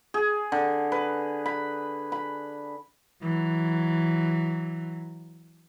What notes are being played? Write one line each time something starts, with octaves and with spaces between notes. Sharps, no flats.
G#4
D3
B4
B5
B5
E3 F#3